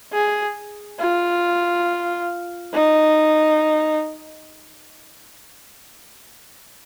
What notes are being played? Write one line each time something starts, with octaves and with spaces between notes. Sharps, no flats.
G#4
F4
D#4